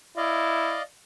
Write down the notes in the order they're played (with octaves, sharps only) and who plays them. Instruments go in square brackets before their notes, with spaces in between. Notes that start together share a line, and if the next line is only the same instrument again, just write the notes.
[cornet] E4 [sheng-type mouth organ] D5 D#5 F5